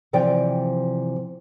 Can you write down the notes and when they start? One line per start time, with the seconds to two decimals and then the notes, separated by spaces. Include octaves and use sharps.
0.13 C3 E3 F3 D5 G5